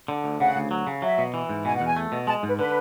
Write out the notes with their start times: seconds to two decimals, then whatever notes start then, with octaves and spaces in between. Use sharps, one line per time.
0.08 D3
0.24 D2
0.40 C#3 F#5
0.56 D2
0.71 F#3
0.87 C#3
1.02 F#3 E5
1.18 B2
1.34 E3
1.49 G#2
1.65 B2 G#5
1.76 E2 F#5
1.86 G#5
1.96 A3
2.12 B2
2.27 G#3 A5
2.43 G#2 B4
2.59 D3 B4